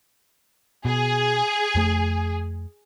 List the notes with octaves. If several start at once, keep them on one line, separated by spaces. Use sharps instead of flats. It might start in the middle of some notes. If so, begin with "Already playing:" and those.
B2 G#4
F2 A3